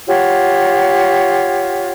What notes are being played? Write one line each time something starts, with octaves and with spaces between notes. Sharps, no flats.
F4 G4 C#5 F#5